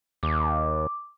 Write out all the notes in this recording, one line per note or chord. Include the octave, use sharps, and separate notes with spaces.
D#2 D6